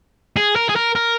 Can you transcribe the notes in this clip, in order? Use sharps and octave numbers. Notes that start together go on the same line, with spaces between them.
G#4
A#4
G#4
A#4
A#4